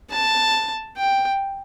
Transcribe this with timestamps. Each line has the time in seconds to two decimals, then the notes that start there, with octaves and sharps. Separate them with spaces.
0.11 A5
0.97 G5